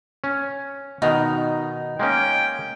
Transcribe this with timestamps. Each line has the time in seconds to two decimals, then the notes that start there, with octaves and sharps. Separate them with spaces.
0.24 C#4
1.02 B2 D#3 D#4
1.99 G#3 A#3 C#4 G5